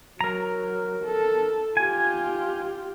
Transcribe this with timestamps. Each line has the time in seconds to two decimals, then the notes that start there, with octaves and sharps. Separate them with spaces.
0.21 F#3 A#4 A#5
1.05 A4
1.77 F4 G4 G#5